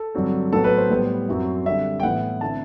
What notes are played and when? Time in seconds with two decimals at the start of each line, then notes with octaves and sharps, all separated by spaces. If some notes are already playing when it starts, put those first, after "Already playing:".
Already playing: A4
0.15 G2 D3 F#3 C4
0.53 A2 F#3 B3 A4
0.64 B4
0.77 C5
0.90 A2 G3 B3
1.28 F#2 F#3 C4 E4
1.66 D3 G3 C4 E5
2.00 G5
2.03 A2 E3 B3 E4 F#5
2.41 D3 A3 C4 E4 A5